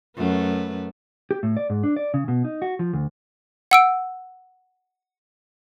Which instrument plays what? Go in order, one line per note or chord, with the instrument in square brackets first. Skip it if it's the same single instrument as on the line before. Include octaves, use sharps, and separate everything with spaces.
[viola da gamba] F#2 A3 B4
[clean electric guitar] G4
A2
D5
G#2
D4
D5
C#3
B2
D#4
F#4
F3
D2
[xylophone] F#5 E6 D7